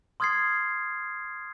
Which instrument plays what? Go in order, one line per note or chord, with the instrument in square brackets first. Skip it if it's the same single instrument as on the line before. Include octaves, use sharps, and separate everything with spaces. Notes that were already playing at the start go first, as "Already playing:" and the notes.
[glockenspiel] C6 D#6 F6 G#6 A6 C7